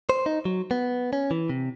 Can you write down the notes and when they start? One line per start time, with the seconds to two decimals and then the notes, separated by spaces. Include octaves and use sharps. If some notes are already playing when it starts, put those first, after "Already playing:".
0.09 C5
0.26 D#4
0.45 F#3
0.71 B3
1.13 C#4
1.31 E3
1.50 C3